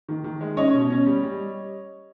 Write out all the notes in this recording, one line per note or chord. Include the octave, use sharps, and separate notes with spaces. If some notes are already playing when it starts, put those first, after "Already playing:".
D#3
D#3
G#3
C#4 C#5 D#5
B2
C#4
G3
G3